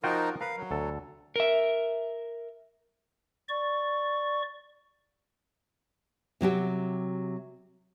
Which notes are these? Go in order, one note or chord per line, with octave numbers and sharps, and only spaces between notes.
F3 D#4 F4 F#4 A#4 G5
A#4 B4 F5
F#3
D2 A4
A#4 E5
D5 C#6
C3 F#3 F#4 G4